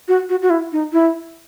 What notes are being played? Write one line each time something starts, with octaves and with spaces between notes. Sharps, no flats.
F#4
F#4
F#4
E4
D#4
E4